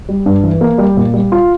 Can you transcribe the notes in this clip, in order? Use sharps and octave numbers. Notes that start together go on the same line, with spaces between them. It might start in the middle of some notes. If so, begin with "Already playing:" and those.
G3
G2
E3
A#3
G3
A#2
G3
F4